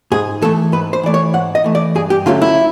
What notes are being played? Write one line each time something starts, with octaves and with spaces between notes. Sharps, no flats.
G#2 G#4
E3 A3 A4
G#2 B4
C5
E3 A3 D5
C#5
G#2 F#5
D#5
E3 A3
D5
G2 G#4
G4
D3 F#3 A3 C#4 F4
E4